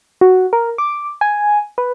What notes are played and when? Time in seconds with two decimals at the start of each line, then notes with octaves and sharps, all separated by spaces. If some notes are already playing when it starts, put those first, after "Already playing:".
0.21 F#4
0.53 A#4
0.78 D6
1.21 G#5
1.78 B4